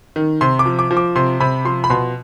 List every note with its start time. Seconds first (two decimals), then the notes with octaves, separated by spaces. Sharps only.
0.16 D#3
0.41 C3 C6
0.59 D6
0.66 F3
0.79 D6
0.91 F3
0.97 D6
1.15 C3 C6
1.40 C3 B5
1.65 F3 C6
1.84 B5
1.90 B2 C6